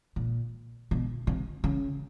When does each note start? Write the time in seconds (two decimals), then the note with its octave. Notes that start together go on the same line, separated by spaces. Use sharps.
0.16 A#2
0.91 B2
1.27 C3
1.64 C#3